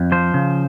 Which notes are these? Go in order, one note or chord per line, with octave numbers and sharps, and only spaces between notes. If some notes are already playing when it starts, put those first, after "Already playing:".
Already playing: F2
F3 C5
C#3